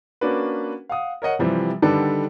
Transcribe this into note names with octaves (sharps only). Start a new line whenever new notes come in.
A#3 C#4 D4 F#4 B4
F5 F#5 D#6
A#4 C#5 D#5 F#5
C3 E3 F3 G3 C4
D3 D#3 G3 D4 A4 B4